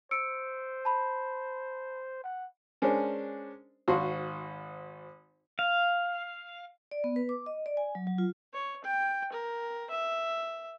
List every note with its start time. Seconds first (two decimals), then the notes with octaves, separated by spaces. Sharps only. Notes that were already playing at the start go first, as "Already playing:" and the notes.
0.11 C5 E6 C#7 D7
0.85 A5 B5
2.24 F#5
2.82 G#3 C#4 D4 A#4 C5
3.88 G#1 F#4 C5 F5 C6 C#6
5.59 F5
6.91 D5
7.04 B3
7.16 B4
7.29 D6
7.46 D#5
7.66 D5
7.77 G#5
7.95 F#3
8.07 F#3
8.18 F4
8.53 C#5
8.84 G5
9.32 A#4
9.90 E5